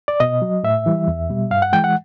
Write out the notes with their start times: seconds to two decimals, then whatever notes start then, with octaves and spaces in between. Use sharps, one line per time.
0.08 D5
0.20 B2 D#5
0.42 F#3
0.64 A2 E5
0.86 E3 G3
1.08 E2
1.29 B2 G3
1.51 G2 F5
1.62 F#5
1.73 E3 G#3 G5
1.84 F#5